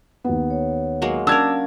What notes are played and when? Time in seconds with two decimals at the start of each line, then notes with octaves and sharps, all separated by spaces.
0.24 D#2 B3
0.50 C#5
1.02 F#3 G#3 A#3
1.27 C#4 D4 A#4 F5 F#5 E6 G#6